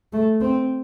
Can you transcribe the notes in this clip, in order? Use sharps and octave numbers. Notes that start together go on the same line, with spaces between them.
A3
C4